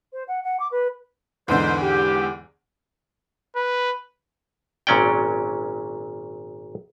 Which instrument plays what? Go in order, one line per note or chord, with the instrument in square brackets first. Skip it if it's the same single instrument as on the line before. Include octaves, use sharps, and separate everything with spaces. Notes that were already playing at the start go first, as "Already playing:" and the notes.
[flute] C5
F#5
F#5
D6
B4
[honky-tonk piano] E2 G#2 D3 [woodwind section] D#4 B4 C5
[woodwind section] G4
[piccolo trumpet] B4
[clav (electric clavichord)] G#1 A#2 F#3 C#4 D5 G5